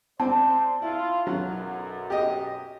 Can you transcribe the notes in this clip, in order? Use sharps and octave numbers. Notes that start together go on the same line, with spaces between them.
C4 C5 D5 A5
E4 F4
B1 F#2 F#3
G4 D#5